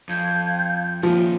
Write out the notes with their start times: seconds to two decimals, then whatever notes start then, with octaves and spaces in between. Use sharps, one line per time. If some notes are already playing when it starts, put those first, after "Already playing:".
0.09 F2 F5 G6 G#6
1.03 D#2 A#2 F3